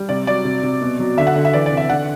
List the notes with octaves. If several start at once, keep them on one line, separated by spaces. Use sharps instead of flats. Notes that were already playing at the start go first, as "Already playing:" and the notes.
Already playing: G3
C3 D5
F#3 D5
C3
C3
B2
F#3
D3 E5
F#5
D3
E5
E3 D5
D5
C3
E5
D3 F#5